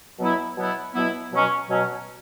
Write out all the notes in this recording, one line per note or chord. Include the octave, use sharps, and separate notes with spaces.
B2 F#3 B3 E4
B2 F#3 B3 E4
B2 F#3 B3 E4
B2 F#3 C#4
B2 F#3 C#4